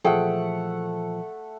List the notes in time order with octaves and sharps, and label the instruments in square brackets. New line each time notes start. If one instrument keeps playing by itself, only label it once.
[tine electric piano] A#2 E3 F3 [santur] A3 F#5 [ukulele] G#4 G5